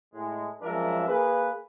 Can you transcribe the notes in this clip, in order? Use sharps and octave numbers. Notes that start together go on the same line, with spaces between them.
A2 G#3
F#2 F3 G#3 D4 A#4 E5
A#3 G#4 A#4 B4